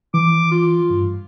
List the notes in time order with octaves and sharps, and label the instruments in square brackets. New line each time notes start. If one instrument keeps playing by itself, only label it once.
[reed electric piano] E3 [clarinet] D6
[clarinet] F4
[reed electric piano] G2